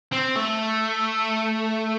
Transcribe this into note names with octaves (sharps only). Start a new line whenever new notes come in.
C4
A3